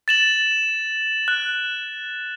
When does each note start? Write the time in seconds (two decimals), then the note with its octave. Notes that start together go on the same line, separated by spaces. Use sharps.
0.08 A6 E7 F#7
1.28 F#6